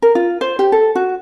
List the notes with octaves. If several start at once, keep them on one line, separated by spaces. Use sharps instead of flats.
A#4
F4
C5
G4
A4
F#4